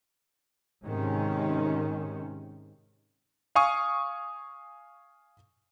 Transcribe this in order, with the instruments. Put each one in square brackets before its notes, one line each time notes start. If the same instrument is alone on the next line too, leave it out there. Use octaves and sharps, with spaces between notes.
[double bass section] G#2 C3 D#3 G#3 C#4
[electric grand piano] F5 G#5 C#6 D#6